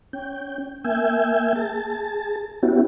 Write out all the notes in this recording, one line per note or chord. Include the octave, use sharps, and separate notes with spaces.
C#4 G5
A#3 E5 G5 G#5
G#4 A5
B3 C#4 E4 F#4 G4